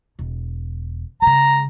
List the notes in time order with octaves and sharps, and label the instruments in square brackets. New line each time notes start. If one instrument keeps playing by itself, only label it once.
[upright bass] E1
[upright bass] C#3 G#3 [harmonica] A#5